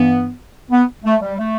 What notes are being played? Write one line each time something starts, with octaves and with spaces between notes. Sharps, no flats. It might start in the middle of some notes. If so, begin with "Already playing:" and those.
Already playing: G2 E3 B3
B3
A3
G3
A3